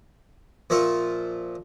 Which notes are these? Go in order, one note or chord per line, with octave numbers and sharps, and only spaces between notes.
A#2 F3 E5 C#6